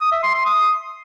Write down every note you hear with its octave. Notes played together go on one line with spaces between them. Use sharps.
D#6
E5
C6
C6
D#6